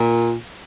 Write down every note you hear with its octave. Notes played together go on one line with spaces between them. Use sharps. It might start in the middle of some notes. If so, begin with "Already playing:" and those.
Already playing: A#2